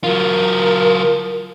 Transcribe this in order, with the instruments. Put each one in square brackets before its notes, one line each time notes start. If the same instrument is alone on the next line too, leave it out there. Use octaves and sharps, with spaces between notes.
[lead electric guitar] F#3 F4 [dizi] A#4